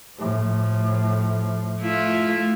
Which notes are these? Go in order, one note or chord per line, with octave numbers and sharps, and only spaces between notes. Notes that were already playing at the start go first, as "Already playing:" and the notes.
A2 F3
A3 E4 F4